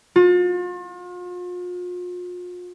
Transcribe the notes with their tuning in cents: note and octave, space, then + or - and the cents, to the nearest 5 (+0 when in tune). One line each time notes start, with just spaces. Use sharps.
F4 +40